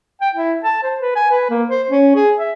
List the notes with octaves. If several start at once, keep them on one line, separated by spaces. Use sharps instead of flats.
G5
E4
A5
C5
B4
G#5
B4
A#3
C5
C#4
G#4
E5